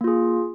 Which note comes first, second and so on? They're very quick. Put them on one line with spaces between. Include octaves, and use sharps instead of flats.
A#3 F4 G#4